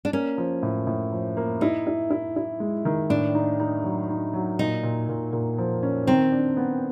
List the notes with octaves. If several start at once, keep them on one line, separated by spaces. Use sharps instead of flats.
D4
A#3 C#4
F3
A2
A2
F3
A#3
D#4 E4
E4
E4
E4
G#3
D#3
A2 D4
D#4
D#4
F#3
D#4
F#3
A#2 D#4
A#2
A#2
A#2
F3
C#4
D#3 C4
D4
B3